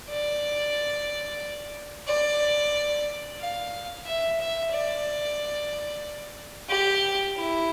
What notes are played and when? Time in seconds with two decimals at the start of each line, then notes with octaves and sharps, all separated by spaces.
0.10 D5
2.08 D5
3.40 F5
4.06 E5
4.40 E5
4.72 D5
6.70 G4
7.37 E4